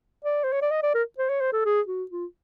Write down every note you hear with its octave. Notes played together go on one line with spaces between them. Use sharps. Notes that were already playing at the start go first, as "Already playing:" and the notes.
D5
C5
C#5
D5
D#5
D5
A#4
C5
C#5
C5
A4
G#4
F#4
F4